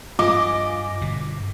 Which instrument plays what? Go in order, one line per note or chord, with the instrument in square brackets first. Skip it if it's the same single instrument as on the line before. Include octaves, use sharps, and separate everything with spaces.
[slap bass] G2 [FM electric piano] F4 G#5 [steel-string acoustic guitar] D#5 [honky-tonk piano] D6
[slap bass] G1 B2